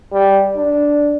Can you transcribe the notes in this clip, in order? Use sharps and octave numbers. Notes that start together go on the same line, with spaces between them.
G3
D4